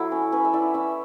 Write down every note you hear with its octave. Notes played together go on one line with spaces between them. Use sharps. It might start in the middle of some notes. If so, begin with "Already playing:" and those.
Already playing: F#3 E4 A4
C#4
C#4 B4
E5
E4 D5
C#4 E5